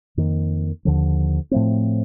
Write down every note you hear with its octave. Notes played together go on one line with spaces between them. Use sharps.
F2 D#3 A#3
D#2 D3 F3
A2 F3 A3 C4